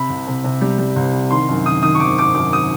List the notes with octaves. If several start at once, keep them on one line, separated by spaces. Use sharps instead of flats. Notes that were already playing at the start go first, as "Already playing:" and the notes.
Already playing: C3 B5
C2
C3
C3
G3
G3
C2
C3
D#3 C6
F#2
D#3 D#6
D#3 D#6
C#6
G#1 D6
G#1 D6
F#2 D6
D#6